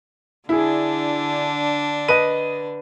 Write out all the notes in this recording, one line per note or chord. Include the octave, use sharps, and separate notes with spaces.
D3 D4 E4 G#4
B4 D#5 D#7